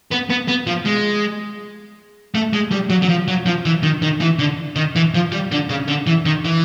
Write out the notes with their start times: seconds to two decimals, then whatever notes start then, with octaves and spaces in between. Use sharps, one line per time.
0.11 B3
0.30 B3
0.48 B3
0.67 F3
0.85 G#3
2.35 A3
2.53 G#3
2.71 G3
2.90 F#3
3.02 F#3
3.09 F3
3.28 F#3
3.46 F3
3.65 E3
3.83 D#3
4.02 D#3
4.21 E3
4.39 D3
4.76 D#3
4.96 E3
5.14 F3
5.32 G3
5.52 D3
5.69 C#3
5.88 D3
6.07 E3
6.25 D#3
6.45 E3